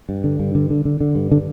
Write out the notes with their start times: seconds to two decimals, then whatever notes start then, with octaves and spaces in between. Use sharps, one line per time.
0.09 G2
0.24 D3
0.40 G2
0.55 D3
0.70 D3
0.85 D3
1.01 D3
1.15 G2
1.32 D3